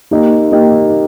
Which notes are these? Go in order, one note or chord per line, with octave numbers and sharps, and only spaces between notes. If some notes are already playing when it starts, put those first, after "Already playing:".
A#3 D#4 G4 D#5
A#3 D#4 G4 D#5